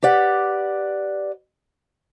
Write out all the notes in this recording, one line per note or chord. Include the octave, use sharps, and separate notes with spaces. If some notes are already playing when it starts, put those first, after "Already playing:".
G4 B4 D5 F#5